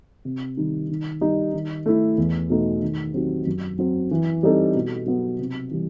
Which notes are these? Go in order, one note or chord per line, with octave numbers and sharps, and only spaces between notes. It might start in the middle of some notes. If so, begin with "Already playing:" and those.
C3
D#3 G3
D#3
G3 D#4
D#3
A3 E4
E2
B2 A3 D#4
D#3
F#3 C4 D#4 G4
F#2
F#3 C4
E3
G3 C4 D#4 A4
B2
F#3 B3
C3
E3 G3